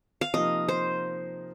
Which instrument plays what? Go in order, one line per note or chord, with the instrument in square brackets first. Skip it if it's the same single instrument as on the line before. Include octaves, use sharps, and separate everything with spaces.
[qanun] F5
[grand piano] C3 F3 A#3 D#4 A#4 [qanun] D#5
[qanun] C5